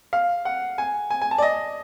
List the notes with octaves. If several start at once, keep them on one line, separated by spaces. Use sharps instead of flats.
F5
F#5
G#5
G#5
G#5
A5
D5
D#5